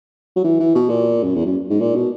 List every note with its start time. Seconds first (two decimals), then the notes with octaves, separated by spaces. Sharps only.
0.36 F#3
0.44 E3
0.60 E3
0.75 B2
0.89 A#2
1.23 F#2
1.35 E2
1.46 F#2
1.69 G#2
1.81 A#2
1.95 B2